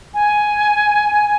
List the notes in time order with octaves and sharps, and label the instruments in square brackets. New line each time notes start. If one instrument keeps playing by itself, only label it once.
[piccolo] G#5